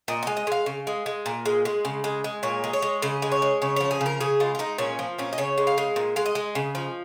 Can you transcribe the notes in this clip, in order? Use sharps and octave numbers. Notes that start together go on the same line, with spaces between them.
A#2 D#5
G#3 D#5
D#5
G#3 F5
C#3
G#3
G#3
A#2
G#3
G#3
C#3
G#3
G#3
A#2 C#5
G#3
C#5
G#3
C#3 D#5
G#3
C#5
G#3
C#3 C#5
F3 C#5
G#4
C#3
A#4
C#3 G#4
G#3 F4
F4
G#3 D#4
A#2 C#4
F3
A#2 C#4
D#5
C#3 C#5
G#3
F5
G#3
A#2
G#3 F5
D#5
G#3
C#3
F3